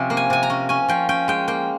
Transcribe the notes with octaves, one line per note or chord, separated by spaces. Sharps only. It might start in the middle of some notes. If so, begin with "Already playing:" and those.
Already playing: C3 F3 C#4 E5
A#3
G#5
C3 G#5
A#5
C#4
C#4 G#5
F3 G5
C#4 G5
G#3 G5
A#3 G5